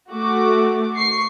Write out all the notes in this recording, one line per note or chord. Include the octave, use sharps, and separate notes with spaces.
A3 F#4 D6
C#6 C7